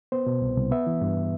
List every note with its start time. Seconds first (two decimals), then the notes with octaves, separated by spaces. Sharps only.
0.12 B3 C5
0.27 B2
0.42 C2
0.57 C2
0.71 B3 E5
0.87 E3
1.01 G2